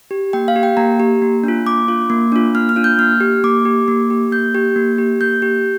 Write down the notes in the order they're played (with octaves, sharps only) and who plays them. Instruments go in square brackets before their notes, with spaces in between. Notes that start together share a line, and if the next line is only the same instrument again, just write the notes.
[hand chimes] G4
A#3 G5
F5
G4
G5
A#3 A#5
G4
A#3
D4 F4
A#3 D6
D4 F4
A#3
D4 F4
A#3 F6
F6
D4 F4
G6
A#3 F6
G4
A#3 D6
G4
A#3
G4
A#3 G6
G4
A#3
G4
A#3 G6
G4